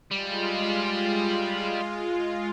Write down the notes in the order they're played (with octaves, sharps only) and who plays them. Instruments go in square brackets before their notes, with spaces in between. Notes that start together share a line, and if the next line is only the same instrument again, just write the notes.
[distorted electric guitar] G3 [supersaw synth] G#3 F4